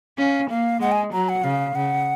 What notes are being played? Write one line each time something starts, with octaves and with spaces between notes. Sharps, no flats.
C#4 F5
A#3 F5
G#3 F#5
G#5
F#3 A#5
F#5
C#3 F5
C#3 F#5